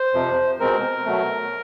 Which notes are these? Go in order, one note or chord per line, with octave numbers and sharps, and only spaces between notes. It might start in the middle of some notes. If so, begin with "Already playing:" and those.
Already playing: C5
F2 C3 F3
B2 G#3 C4 A#4
B2 F#3 A3